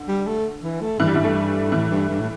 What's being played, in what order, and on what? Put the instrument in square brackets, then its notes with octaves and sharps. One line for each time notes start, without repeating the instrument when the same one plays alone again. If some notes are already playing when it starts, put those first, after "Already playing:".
Already playing: [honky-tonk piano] D3
[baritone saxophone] G3
A3
E3
A3
[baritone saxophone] G2 [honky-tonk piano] E3
[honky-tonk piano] G3
E3
A3
[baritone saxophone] A2 [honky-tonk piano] E3
[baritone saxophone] G2
G2
A2